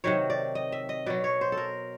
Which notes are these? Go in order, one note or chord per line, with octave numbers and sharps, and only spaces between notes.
C3 D#3 F#3 C#5
D5
D#5
E5
D#5
B2 F#3 D5
C#5
C5
A4
A#4